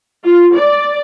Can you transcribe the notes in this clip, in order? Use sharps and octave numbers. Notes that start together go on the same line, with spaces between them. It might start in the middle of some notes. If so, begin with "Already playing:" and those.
F4
D5